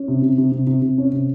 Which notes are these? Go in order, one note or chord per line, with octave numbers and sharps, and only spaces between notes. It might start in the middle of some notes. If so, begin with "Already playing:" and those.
Already playing: C#4
C3
C3
C3
C3
C3
C3
C#4
C3